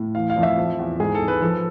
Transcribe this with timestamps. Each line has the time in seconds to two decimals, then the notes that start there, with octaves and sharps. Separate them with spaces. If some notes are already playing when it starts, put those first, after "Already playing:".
Already playing: A2
0.15 E3 F5
0.30 F5
0.36 F2
0.43 E5
0.57 F3
0.79 E2
1.00 G#2 G#4
1.15 A4
1.22 G#2
1.28 B4
1.42 F3 A4